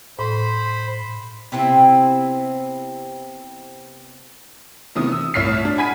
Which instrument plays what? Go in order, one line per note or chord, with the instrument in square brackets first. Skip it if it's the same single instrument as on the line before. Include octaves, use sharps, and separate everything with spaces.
[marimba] A2 [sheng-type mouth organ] C5 B5
[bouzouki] C3 B3 C4 E4
[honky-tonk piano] C3 D#3 E3 B3 D#6
E6
C2 A2 C#5 F6 B6 C7
D4
F#5 G#5 B5 G#6 B6 D#7